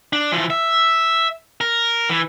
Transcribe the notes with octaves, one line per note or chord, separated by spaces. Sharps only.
D4
E3 F3
E5
A#4
E3